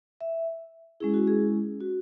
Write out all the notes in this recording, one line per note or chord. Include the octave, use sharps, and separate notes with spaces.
E5
G#3 C#4 E4 G#4
F#4
G#4
F#4